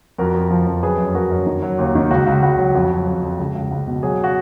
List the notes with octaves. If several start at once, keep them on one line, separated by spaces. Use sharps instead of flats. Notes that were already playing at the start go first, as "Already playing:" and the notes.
F2 F#4 A#4
F2
F3
F2
F#2 G#4 B4
F#2
F#2 F#4 A#4
F#2
D#3
F#3
D#2
D#3
C#2 F#4
C#2
C#2 F#4
F#3
F2 F#4
F#3
F2
F2
C#2
C#2
C#2
B2
F#3 G#4
F#4